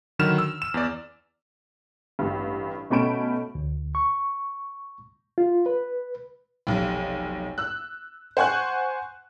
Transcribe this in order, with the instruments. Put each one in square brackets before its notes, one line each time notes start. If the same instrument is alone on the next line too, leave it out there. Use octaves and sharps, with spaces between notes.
[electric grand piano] D3 D#3 F#3 B5 F6 E7
E6
E7
E2 D5
[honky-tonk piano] A1 G2
B2 A3 C#4 B5 D7 E7
[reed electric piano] D2
C#6
F4
B4
[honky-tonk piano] F1 B1
E6 F#6
C5 F#5 G#5 C#6 F#6